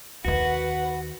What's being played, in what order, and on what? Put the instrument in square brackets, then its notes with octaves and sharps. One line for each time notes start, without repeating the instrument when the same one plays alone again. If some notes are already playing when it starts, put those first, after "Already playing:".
[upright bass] D#2 D#3 [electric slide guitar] F#4 [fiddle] B4 F#5